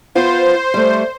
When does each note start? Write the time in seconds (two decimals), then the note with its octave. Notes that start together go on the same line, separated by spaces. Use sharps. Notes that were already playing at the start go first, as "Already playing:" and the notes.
0.15 B3 F4 C5
0.74 G3 A3